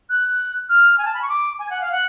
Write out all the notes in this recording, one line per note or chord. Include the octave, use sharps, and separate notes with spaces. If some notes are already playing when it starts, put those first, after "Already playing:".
F#6
F6
G#5
A5
B5
C#6
D6
G#5
F#5
F5
F#5